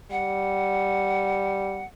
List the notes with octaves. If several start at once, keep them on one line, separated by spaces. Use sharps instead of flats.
G3 F#5